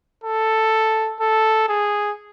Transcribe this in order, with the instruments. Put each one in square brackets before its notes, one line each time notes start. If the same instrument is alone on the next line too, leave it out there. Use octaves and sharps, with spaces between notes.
[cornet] A4
A4
G#4